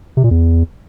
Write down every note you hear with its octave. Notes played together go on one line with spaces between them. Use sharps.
C3
A#2
E2